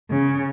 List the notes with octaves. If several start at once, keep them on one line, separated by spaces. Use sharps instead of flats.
C#3